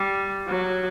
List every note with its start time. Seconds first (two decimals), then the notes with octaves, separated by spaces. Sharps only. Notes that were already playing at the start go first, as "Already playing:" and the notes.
Already playing: G3
0.47 F#3